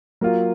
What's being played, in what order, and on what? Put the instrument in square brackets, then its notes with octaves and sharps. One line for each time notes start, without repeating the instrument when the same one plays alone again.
[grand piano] F#3 A#3 F4